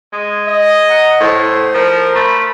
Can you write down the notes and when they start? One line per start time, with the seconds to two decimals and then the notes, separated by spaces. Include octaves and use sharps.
0.13 G#3
0.48 D#5
0.90 F#5 A#5
1.21 A2 C5
1.74 F3 A#4
2.15 A3 B5